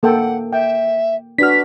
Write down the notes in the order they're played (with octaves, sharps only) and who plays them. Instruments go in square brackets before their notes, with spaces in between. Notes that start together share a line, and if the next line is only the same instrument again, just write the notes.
[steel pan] A#3 A4 G5 [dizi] F#5
[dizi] E5 [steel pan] G5
[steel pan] D4 F#4 [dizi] B4 [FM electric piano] F6 B6